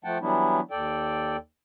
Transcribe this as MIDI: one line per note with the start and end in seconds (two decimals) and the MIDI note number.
0.04 0.18 53
0.04 0.18 57
0.04 0.18 78
0.04 0.18 79
0.04 0.18 81
0.21 0.60 52
0.21 0.60 54
0.21 0.60 55
0.21 0.60 59
0.21 0.60 62
0.21 0.60 64
0.71 1.37 39
0.71 1.37 69
0.71 1.37 74
0.71 1.37 79